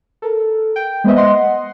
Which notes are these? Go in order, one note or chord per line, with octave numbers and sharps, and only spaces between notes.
A4 A#4
G5
G#3 B3 B4 C5 D#5 E5
D#5 F#5 C6